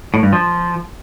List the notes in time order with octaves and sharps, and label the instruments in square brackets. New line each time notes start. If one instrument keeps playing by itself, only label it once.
[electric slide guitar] A2
G2
F3